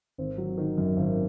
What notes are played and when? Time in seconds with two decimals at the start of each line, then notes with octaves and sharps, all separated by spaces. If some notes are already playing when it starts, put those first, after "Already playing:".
0.18 G#1 C4
0.38 F#3
0.58 D#3
0.78 F#2
0.97 G#1